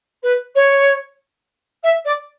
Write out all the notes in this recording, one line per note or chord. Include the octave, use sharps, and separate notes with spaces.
B4
C#5
E5
D5